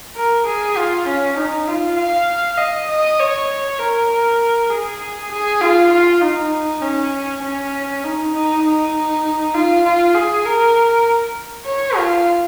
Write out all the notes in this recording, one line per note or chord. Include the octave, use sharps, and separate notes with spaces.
A#4
G#4
F4
C#4
D#4
F4
F5
D#5
D#5
C#5
A#4
G#4
G#4
F4
F4
D#4
C#4
C#4
D#4
D#4
D#4
F4
F4
G#4
A#4
C#5
F4